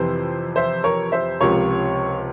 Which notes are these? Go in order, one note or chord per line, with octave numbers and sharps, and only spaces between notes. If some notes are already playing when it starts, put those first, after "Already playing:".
Already playing: F2 C3 E3 C5
C5 E5
A#4 C#5
C5 E5
C#2 C3 F3 A#4 C#5